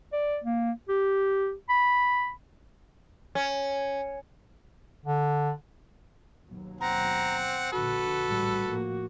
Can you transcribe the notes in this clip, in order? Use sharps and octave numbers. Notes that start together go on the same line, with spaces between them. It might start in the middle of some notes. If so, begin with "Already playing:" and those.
D5
A#3
G4
B5
C#4
D3
D#2 B2 F#3
C4 F#5 A#5
A#1 D3 F#4 A4 B4
A1 G3
A2 F3 A#3